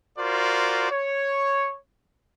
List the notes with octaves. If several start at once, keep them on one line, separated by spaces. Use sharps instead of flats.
F4 F#4 A#4 C5 D5
C#5